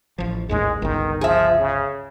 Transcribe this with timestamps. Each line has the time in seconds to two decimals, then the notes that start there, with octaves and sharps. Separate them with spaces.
0.18 A1 F3
0.49 A1 D#2 G#2 G#3
0.82 G1 C#2 D#3
1.21 F3 G#4 E5
1.59 C#3